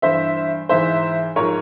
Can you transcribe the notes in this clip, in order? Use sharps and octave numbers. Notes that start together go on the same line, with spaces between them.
G2 E3 C5 E5
G#2 E3 C5 E5
G#2 F3 A#4 C#5